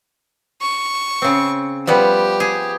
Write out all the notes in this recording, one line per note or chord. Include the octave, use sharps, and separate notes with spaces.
C#6
C#3 C4
F3 G3 B3 G4
G#4